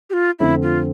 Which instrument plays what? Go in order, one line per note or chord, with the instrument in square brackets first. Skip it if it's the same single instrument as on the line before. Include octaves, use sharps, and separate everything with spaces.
[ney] G4
F4
[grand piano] F2 D3 A3 C4 [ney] E4
[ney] F4